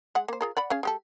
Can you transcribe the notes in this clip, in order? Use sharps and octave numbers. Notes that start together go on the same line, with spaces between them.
G#3 F#5
A#3 C5
F4 G#4 A#4
D5 F#5 B5
C#4 G#4 F5
G#3 G4 A4